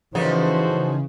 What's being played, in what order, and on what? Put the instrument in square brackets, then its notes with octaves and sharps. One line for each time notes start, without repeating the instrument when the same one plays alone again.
[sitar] A2 F3 D#4 [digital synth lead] C#3 [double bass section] E3 [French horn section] F#4 A4 C5